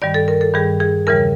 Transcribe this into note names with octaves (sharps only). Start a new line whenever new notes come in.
G2 D#3 G3 D5
A4
A#4
A4
G2 D#3 G3 G#4
G#4
E2 C#3 E3 G3 A#4